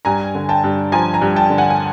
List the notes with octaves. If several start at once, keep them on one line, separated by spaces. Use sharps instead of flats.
G2 G#5 A#5
D3
G5 A5
G2
F3 G#5 A#5
G#5 A#5
G2
G5 A5
D3
F#5 G#5
G#5